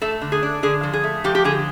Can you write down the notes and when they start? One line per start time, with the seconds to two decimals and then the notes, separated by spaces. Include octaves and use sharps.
0.02 A3 A4
0.21 D3
0.32 G#4
0.43 D4
0.63 D3 G#4
0.83 F3
0.93 G#4
1.04 A3
1.24 F3 G4
1.35 G4
1.44 D3 G#4